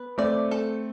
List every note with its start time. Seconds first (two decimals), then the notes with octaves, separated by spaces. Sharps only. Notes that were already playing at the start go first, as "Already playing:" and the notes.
Already playing: B3 B4
0.18 A3 C4 D5
0.51 A4